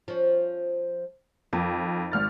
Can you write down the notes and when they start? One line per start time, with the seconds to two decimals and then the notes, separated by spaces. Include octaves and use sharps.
0.08 F3 C#4
1.53 F2 D#3
2.12 G#1 F6 A6